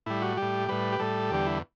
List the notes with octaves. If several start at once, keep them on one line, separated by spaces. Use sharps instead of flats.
A2 G3 E4
F#4
A2 G3 G4
A2 G3 B4
G4
A2 G3 A4
E2 D3 G3 G4
E4